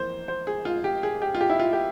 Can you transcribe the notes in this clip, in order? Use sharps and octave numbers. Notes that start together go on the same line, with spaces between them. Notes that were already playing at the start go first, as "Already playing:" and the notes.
Already playing: F2 E3 A#3 C5
C5
G#4
F4
G4
G#4
G4
F4
G4
E4
F4
G4